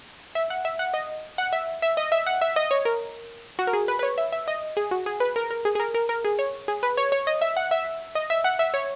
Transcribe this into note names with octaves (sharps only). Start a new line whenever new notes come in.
E5
F#5
E5
F#5
D#5
F#5
E5
E5
D#5
E5
F#5
E5
D#5
C#5
A#4
F#4
A#4
G#4
B4
B4
C#5
E5
E5
D#5
G#4
F#4
G#4
B4
A#4
A#4
G#4
G#4
A#4
A#4
A#4
G#4
C#5
G#4
B4
C#5
C#5
D#5
E5
F#5
E5
D#5
E5
F#5
E5
C#5